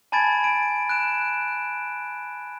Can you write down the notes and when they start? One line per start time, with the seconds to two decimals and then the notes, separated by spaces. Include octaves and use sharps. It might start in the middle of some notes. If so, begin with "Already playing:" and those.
0.12 G#5 A5 B5 G#6 A6 D7
0.44 D7
0.89 F#6 D7 E7